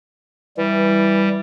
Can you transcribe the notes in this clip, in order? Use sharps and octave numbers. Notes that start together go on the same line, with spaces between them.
E3 G3